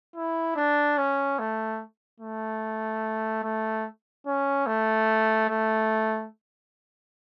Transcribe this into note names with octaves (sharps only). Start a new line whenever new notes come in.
E4
D4
C#4
A3
A3
A3
C#4
A3
A3